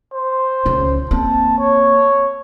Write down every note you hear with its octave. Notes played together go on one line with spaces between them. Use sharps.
C5
C#2 C#3
A#3 C4 A5
C#5